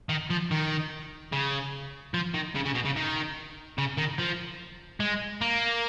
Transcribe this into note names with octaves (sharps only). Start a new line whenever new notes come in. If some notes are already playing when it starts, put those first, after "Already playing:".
D#3
F3
D#3
C#3
F3
D#3
C#3
C#3
B2
C#3
D#3
C#3
D#3
F3
G#3
A#3